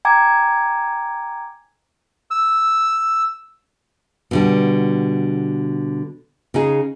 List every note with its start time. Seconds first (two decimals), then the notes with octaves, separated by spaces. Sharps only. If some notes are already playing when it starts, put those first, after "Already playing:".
0.05 G5 G#5 A#5 D6 G#6
2.31 E6
4.31 B2 D3 G3
6.54 C#3 D#4 G#4